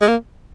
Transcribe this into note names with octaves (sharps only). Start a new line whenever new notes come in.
G#3
A#3